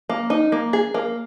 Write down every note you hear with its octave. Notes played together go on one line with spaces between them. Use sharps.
A#3
D#4
A#3
G#4
A#3